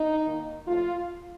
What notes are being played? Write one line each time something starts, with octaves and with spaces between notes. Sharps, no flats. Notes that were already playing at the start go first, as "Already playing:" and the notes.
Already playing: D#4
D#3 A#3 D#4
A2 F3 A3 F4